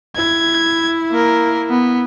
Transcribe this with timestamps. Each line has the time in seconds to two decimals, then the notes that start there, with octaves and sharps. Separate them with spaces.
0.16 E4 G#6
1.11 A#3 A#4
1.70 B3